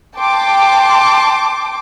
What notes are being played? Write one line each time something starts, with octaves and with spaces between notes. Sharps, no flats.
G5 A5 C6 D6